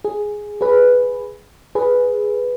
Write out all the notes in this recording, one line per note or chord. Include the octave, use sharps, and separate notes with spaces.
G#4
G#4 B4
G#4 B4